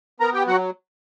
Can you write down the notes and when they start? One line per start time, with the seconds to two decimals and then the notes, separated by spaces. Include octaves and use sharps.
0.20 B3 A#4 A#5
0.34 G4 G5
0.47 F#3 F#4 F#5